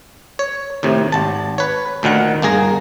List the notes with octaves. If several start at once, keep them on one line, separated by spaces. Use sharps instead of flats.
C#5
D#2 A2 C3
G#1 A5
B4 C#5
D2 A#2 D#3 F#5
G1 A#3 G#4 A#5